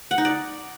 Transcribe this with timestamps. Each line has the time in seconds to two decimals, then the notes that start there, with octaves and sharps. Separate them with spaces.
0.11 F#5
0.18 D#4
0.25 D5